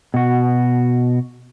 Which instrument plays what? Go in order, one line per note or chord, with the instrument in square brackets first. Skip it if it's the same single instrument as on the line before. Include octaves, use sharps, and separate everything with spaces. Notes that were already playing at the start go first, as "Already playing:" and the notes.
[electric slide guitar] B2 F#4